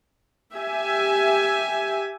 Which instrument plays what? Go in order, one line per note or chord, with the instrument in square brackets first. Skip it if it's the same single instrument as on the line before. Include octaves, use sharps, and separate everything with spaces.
[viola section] G4 E5 G#5